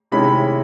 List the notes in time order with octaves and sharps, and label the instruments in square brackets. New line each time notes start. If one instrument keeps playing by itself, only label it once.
[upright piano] C3 D#3 G#3 C#4 E4 B5